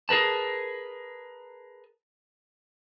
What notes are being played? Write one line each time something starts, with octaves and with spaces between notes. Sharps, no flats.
G#4 A#4 B4 A5